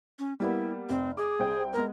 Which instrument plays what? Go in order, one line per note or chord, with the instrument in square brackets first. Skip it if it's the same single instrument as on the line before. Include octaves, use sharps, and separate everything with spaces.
[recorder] C#4
[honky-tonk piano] G3 A#3 B3 [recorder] E4
[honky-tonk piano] F1 [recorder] C4
[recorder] G#4 [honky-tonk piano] D6
[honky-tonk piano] C2 C4 G5
[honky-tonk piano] G#3 B3 [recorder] A#4